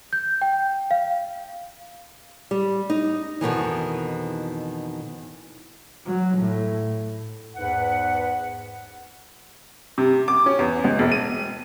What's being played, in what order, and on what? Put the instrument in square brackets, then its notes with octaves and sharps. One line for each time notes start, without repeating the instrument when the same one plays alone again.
[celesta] G6
G5
F5
[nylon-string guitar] G3
D#4
F2 B2 D#3 E3
[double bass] F#3
A2
[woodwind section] E2 G#2 B4 F#5
[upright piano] C3
D6
C#4
E2
C#2
E1
D#7